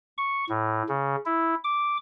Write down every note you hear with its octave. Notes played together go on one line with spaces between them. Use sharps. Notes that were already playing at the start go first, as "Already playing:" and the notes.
C#6
A2
C#3
E4
D6